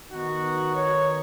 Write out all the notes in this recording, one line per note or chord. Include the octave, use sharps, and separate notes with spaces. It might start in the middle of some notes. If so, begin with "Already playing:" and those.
D#3 B3 D#4 F#4
C#5